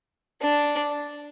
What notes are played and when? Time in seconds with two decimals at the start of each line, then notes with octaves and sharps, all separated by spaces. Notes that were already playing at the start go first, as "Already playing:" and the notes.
0.42 D4